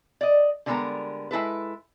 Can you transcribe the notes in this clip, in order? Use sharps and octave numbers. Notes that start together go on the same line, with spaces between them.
D5 D#5
D3 G3 G#3 B3 A#4 A#5
G#3 E4 A4 B4